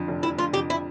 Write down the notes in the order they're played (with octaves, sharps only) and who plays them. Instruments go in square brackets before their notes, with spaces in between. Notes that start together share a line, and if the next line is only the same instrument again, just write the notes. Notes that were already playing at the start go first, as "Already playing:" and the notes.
Already playing: [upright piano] F2 D3
F1
[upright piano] F1 [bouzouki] E4
[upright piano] D3 [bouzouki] F4
[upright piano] F2 [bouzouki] G4
[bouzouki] E4